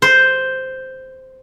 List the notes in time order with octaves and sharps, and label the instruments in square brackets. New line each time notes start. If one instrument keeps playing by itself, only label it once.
[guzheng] C5